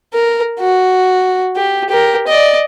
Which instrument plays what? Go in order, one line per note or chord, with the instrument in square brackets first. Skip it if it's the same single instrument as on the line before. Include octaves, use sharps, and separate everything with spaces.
[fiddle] A#4
F#4
G4
G4 A#4
D5 D#5